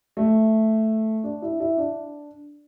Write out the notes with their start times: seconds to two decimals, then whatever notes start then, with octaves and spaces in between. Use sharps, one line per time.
0.17 A3
1.24 D4
1.42 E4
1.60 E4
1.77 D4